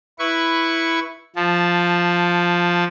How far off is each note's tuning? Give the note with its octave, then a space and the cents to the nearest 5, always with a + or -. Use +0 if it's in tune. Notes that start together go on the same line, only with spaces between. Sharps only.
E4 +0 B4 +0 C#6 +0
F3 +0 A5 +0